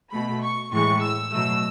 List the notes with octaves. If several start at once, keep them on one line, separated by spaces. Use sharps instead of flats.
B2 A3 B5
C#6
A2 E3 G#3 C#6
E6
B2 F#3 A3 E6